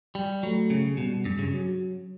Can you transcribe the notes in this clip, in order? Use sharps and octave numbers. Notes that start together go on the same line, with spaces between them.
G3
F#3 A3
C#3
B2 G3
G2
C#3
F#3